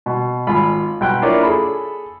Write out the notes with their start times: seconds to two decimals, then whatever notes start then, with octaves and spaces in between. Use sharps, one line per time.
0.06 B2
0.47 G#1 F4 B5
1.01 B1 G5 F#6
1.22 A#3 D4 E4 F4 C#5 D5
1.43 G#4 A4 B5